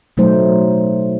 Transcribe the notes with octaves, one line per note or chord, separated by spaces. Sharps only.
B2 F#3 A3 D#4 C5